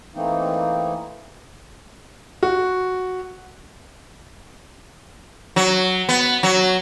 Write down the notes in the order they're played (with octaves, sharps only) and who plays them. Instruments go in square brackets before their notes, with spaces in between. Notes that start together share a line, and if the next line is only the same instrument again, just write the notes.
[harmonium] E3 A3 A#3 C4 D#4
[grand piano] F#4
[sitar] F#3
B3
F#3